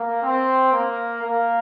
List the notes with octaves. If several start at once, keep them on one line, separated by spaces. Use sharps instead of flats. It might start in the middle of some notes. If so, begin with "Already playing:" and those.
Already playing: A#3
C4
A#3
A#3